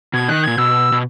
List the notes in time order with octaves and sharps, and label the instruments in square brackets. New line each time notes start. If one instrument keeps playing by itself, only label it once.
[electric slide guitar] B2 [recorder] G#6
[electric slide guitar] D#3 [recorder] F#6
[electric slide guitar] A#2 [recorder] G#6
[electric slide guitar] B2 [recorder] E6
[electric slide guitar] B2